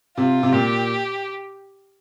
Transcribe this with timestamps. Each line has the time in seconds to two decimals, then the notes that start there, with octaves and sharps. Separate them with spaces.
0.17 C3 F4
0.43 C3
0.53 A#2 G4